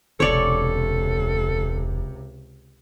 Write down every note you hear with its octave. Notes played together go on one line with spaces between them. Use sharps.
E1 C#2 C3 A4 C#5 D5